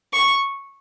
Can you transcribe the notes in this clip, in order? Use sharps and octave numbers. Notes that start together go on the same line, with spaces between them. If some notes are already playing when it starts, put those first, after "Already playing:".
C#6